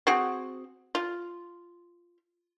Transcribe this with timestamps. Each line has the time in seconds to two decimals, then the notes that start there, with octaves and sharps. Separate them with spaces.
0.07 C4 F#4 G#4
0.95 F4